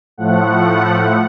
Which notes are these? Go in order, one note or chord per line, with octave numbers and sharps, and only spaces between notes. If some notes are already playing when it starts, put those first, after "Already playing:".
A2 F3 A3 F#5